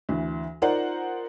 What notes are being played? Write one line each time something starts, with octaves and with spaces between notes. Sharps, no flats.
D2 E3
D#4 F4 A#4 C5 D5 F#5